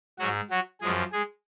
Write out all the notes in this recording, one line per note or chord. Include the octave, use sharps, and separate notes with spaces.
G#2 F#3 F#4
F#3 F#4
F#2 F3 G#3 G#4
G#3 G#4